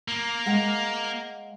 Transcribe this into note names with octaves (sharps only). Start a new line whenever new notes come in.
A#3
G#3 F5 F#5